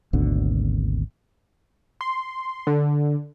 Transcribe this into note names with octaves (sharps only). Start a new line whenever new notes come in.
G#1 D2 B2 D3
C6
D3